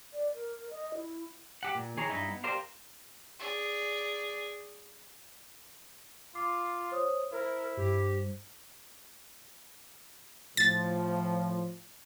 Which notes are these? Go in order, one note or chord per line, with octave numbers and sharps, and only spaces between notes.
D5
A#4
D#5
E4
G4 F#5
A#2
D#3 G#4 C#5 A#5
G2 D#4 E4
B3
G4 A#4 C5 D5 F5
G#4 D5
F4 D6 C7
C5 C#5 D#6
E4 A#4 C5
G2 G4
A2 F3 A6